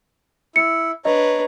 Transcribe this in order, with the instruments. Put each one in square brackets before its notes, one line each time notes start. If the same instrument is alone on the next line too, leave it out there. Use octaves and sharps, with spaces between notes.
[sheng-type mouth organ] E4 [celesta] C#7
[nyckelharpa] D4 B4 [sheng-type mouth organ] C#5 A#5 [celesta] D#5